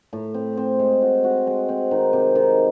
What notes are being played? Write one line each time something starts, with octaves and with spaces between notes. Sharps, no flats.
A2
C4
C4
G#3
F#4
F#4
G#3
C4
D#3
C3
D#3